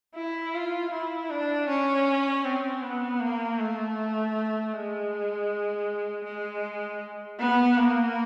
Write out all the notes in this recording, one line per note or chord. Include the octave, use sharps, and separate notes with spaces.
E4
F4
E4
D4
C#4
C4
B3
A#3
A3
G#3
G#3
B3
A#3